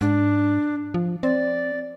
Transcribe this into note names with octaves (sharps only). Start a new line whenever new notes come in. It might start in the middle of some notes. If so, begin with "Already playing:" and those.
G#2 D4
F3
C4 D5